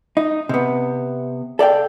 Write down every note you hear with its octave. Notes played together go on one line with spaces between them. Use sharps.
D#4
C3 B3
A4 D5 F5 G5